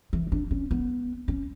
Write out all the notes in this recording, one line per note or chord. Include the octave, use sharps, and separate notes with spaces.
E3
D4
C#4
B3
C#4